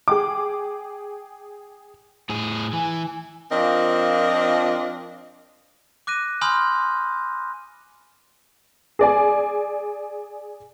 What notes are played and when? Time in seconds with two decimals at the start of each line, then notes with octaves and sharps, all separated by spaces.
0.08 G#4 G5 D6
2.29 A2 G#4
2.73 E3 G#5
3.51 F3 C4 D4 F4 A#4 D#5
6.07 D6 F#6 A#6 D#7
6.41 G#5 B5 C6 D#6 F6 G6
8.99 G#4 D5 G#5